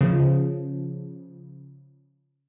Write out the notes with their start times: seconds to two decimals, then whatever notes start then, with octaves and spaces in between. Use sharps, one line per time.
0.01 C#3 F3